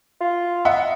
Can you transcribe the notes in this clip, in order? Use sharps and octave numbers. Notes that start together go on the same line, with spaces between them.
F4
D#5 E5 F#5